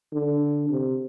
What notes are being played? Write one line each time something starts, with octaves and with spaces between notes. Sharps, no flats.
D3
C3